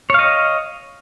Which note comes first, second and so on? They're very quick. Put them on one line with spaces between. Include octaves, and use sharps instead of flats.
C#5 F5 D#5